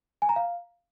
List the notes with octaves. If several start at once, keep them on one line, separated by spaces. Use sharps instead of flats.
G#5
A#5
F5